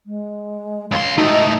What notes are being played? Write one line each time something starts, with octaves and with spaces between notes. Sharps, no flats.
G#3
C#2 F5 C6
G#2 A3 D#4 F#4
D#5